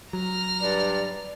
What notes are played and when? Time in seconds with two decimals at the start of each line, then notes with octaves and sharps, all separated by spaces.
0.13 F#3 A#5 F6
0.61 G2 D5